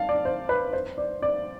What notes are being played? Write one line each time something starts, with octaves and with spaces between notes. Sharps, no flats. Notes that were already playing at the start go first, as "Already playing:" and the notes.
Already playing: F5 A5
D5
C5
B4
C5
D5
D5